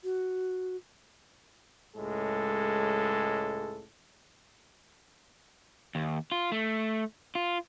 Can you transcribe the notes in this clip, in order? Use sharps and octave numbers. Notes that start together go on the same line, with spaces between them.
F#4
C#2 A2 G#3 A4
D#2
F4
A3
F4